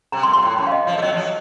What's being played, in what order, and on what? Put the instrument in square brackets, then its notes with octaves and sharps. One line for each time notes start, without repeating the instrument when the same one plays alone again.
[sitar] C3 [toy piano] A#5
[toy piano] C6
[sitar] A#2
[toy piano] C6
[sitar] A2
F#2
[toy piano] F5
D#5
[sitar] F3
[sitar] A3 [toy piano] C#5
[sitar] F#3 [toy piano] D#5
[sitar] F3
F#3